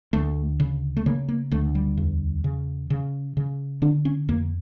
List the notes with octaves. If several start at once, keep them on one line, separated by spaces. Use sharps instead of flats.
D2 A3
C#3
A3
C#3 A#3
A#3
D2 A3
G3
E2
C#3
C#3
C#3
D3 D4
C#4
F2 A#3